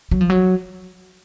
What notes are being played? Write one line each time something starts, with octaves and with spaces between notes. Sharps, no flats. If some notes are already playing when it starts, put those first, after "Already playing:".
F#3
F3
F#3